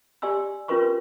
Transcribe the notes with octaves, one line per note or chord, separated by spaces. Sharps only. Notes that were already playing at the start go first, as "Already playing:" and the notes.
G4 D5 G#5 C6 E6
C#4 F4 A#4 B4 C6 C#6